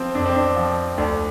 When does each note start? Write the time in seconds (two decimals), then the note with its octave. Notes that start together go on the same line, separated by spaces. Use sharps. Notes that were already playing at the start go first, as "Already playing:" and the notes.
Already playing: F3 C4
0.15 F2 D4
0.26 C4
0.36 D4
0.56 F3
0.98 D2 D4